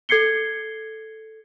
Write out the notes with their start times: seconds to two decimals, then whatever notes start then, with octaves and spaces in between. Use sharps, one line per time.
0.09 A4 G#6 C7 C#7 G7